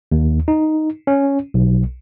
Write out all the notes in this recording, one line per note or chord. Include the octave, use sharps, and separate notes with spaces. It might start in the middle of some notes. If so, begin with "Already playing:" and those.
D#2
D#4
C#4
B1